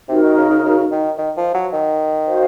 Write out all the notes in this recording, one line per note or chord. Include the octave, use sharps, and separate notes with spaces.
C3 D#4 F#4 A#4
D#3
C#3
C#3
C#3
D#3
D#3
F3
F#3
D#3
F#4 C5 F5